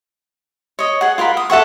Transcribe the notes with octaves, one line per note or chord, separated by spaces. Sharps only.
C#5 D#5
G#4 F#5
F4 A#4 F#5 B5
D#6
A4 E5 F#5 C#6